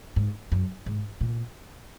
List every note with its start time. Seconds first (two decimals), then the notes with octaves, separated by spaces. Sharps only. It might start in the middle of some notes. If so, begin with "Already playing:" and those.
0.16 G#2
0.52 F#2
0.86 G#2
1.21 A#2